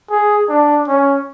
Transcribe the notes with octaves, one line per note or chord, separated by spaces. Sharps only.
G#4
D4
C#4